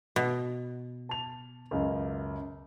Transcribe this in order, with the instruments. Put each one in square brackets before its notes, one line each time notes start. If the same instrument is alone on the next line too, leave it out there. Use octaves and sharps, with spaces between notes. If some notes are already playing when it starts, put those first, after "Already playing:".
[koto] B2
[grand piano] A5 F7
C#2 F#2